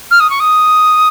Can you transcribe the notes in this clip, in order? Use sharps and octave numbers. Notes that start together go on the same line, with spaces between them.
F6
D#6
C#6
D#6